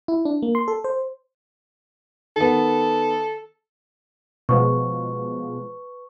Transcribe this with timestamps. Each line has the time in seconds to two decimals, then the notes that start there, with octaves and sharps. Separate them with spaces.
0.08 E4
0.25 D4
0.42 A#3
0.55 C6
0.68 A4
0.84 C5
2.36 D#3 B3 A4
4.49 B2 F3 G#3 B4 C#6